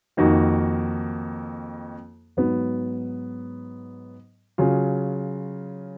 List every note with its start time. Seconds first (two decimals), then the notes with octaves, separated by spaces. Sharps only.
0.17 F2 D#3 A#3 D#4 F#4
2.37 G#2 F#3 B3
4.58 C#3 F#3 C#4 F4